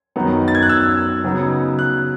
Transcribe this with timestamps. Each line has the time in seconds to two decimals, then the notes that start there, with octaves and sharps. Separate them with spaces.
0.16 F#2 D#3 F#3 B3 D#4
0.48 A6
0.55 G#6
0.63 F#6
0.69 E6
1.24 C#3 F#3 B3 D#4
1.79 F#6